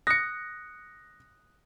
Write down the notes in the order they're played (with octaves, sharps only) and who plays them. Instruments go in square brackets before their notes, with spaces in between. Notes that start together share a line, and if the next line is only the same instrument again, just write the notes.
[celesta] D#6 F#6 [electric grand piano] A#6 C#7